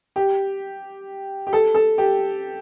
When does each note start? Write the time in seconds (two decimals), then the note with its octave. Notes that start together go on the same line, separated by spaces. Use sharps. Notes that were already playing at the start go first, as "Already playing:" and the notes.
0.16 G4
1.47 G4
1.53 A4
1.75 A4
1.98 G4